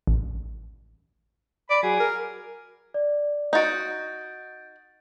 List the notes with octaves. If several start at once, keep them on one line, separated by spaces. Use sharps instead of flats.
A1
D5 B5
F#3 G#4
A#4
D5
D#4 F#4 G6 A6 D7